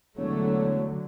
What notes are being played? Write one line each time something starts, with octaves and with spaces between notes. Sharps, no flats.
E1 D3 F#3 A3 C#5